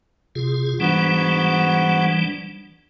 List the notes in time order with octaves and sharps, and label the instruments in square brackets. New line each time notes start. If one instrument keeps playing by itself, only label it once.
[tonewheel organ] C3 F4 G#4
[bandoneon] G#2 B3 F#4 [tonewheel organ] E3 G3 D4